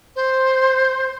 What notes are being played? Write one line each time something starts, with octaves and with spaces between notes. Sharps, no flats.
C5